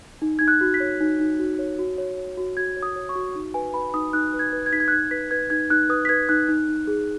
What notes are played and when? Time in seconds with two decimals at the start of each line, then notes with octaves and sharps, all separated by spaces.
0.22 D#4
0.39 D#4 G#6
0.48 F#6
0.61 F#4
0.74 B6
0.80 C#5
1.00 D#4
1.20 D#4
1.39 F#4
1.59 C#5
1.79 F#4
1.98 C#5
2.18 C#5
2.37 F#4
2.57 F#4 G#6
2.77 C#5
2.83 D#6
2.96 C#5
3.09 C#6
3.16 F#4
3.35 D#4
3.54 B4 G#5
3.74 B4 B5
3.94 D#4 D#6
4.13 D#4 F#6
4.33 B4
4.39 G#6
4.53 B4
4.66 G#6
4.72 D#4 B6
4.80 G#6
4.88 F#6
4.92 D#4 G#6
5.11 B4 B6
5.31 B4 G#6
5.50 D#4 G#6
5.70 D#4 F#6
5.89 B4 D#6
6.05 B6
6.09 B4 G#6
6.29 D#4 F#6
6.49 D#4
6.69 D#4
6.87 G#4